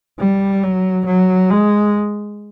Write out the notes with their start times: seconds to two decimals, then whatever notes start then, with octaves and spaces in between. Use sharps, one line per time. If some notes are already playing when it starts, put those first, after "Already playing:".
0.19 G3
0.63 F#3
1.06 F#3
1.50 G#3